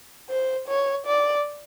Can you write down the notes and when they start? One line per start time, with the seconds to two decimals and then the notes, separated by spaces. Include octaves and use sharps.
0.30 C5
0.68 C#5
1.06 D5